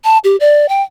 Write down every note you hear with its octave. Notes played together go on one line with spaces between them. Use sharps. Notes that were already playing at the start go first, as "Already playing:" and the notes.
A5
G4
D5
G5